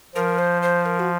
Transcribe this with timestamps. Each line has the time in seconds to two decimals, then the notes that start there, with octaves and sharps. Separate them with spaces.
0.15 F3 A#4
0.38 C5
0.62 C5
0.86 A#4
0.99 F#4